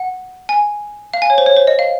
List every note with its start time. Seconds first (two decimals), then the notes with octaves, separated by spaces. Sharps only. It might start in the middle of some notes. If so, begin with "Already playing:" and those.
Already playing: F#5
0.49 G#5
1.14 F5
1.22 G#5
1.30 C#5
1.38 C5
1.46 C#5
1.57 C5
1.67 D#5
1.79 F5